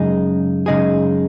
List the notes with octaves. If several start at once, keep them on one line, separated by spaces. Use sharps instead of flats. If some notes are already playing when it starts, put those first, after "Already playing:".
Already playing: F#2 C#3 G#3 D#4 G#4
F#2 C#3 G#3 D#4 G#4